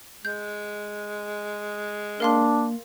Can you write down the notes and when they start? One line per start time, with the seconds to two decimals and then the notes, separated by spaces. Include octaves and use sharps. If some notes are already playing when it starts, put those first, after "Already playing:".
0.25 G#3 G6
2.20 A#3 D4 A#4 F5 C6